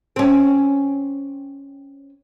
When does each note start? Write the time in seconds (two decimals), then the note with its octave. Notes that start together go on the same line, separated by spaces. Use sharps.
0.16 C4 C#4